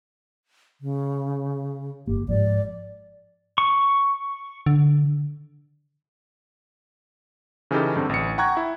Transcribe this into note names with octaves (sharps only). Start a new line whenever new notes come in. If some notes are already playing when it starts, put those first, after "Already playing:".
C#3
G1 A#3 G4
G#2 F3 D5
C#6
D3
C#3 E3 C#4 D#4 G4 A4
G2 D3 C4
A1 C#7
F#5 G5 A#5 C#6 F#6 G#6
E4